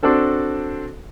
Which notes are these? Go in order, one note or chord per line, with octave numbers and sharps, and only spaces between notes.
C4 D4 F#4 A4 C5